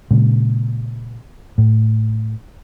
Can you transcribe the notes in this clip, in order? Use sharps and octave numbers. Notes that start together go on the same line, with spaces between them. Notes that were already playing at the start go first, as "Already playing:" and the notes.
A#2 C#3 G#3
A2